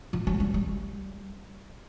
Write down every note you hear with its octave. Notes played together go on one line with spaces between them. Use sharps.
F3
F#3
G3
G3